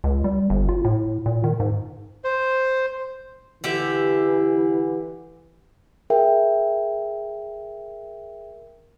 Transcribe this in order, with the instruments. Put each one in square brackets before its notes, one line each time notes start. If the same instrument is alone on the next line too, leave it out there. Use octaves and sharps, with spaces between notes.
[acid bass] C#2
G3
G1
F4
A2
A#2
D#3
G#2
[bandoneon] C5
[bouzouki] D3 G4 E5 [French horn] E3
[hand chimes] G#4 A#4 E5 G5